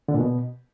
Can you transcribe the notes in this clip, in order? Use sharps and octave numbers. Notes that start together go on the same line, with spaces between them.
D3
A#2
B2